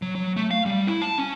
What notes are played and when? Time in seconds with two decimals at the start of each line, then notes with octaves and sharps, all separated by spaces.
0.02 F#3
0.15 F#3
0.37 A3
0.51 F5
0.66 G3
0.87 E4
1.02 A5
1.18 C#4